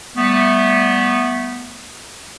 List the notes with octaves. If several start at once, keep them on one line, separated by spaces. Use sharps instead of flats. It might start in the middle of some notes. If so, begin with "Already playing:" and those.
G3 A3 B3